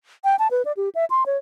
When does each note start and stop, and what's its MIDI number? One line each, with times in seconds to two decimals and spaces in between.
0.24 0.36 79
0.39 0.48 81
0.51 0.62 71
0.65 0.72 74
0.77 0.89 67
0.95 1.05 76
1.10 1.24 84
1.26 1.37 73